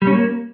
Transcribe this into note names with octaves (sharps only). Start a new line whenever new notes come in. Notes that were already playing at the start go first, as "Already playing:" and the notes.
G3
C#4
A#3